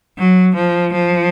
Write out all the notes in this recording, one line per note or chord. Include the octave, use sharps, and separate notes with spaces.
F#3
F3
F3